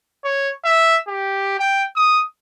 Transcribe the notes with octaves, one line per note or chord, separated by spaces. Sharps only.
C#5
E5
G4
G5
D#6